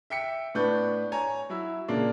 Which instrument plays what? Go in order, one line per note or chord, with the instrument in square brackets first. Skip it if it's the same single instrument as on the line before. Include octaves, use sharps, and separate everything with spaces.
[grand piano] E5 G5 B6 C#7
A2 B3 D4 B4 C#6 G6
C#5 G#5 A#5
F#3 E4 E6
A#2 C#3 A#3 D4